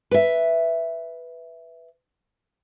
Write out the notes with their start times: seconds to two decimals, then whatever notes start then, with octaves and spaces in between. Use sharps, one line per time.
0.11 B4 E5